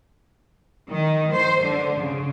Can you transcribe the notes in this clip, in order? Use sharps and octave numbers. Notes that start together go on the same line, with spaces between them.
D#3
C5
D3
C#3